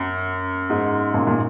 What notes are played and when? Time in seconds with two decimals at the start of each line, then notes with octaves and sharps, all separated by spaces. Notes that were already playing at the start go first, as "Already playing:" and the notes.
Already playing: F#2
0.70 G#2
1.14 F#2 A#2
1.27 A#2